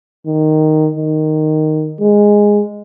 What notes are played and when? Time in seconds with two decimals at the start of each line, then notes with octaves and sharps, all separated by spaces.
0.26 D#3
0.96 D#3
2.00 G#3